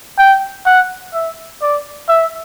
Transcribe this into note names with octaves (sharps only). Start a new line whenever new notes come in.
G5
F#5
E5
D5
E5